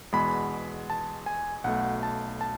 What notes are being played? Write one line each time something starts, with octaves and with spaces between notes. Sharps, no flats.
E2 B2 G#3 B3 B5
A5
G#5
B1 B2 A3 F#5
A5
A5